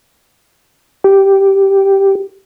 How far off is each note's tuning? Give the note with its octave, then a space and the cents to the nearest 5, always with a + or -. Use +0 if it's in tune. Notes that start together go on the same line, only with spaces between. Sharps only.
G4 -5